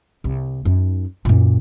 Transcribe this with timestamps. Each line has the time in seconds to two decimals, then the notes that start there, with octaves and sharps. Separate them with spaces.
0.24 C2
0.65 F#2 D#4
1.25 F#2 A#2